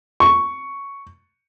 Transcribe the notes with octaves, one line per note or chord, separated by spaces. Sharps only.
C#6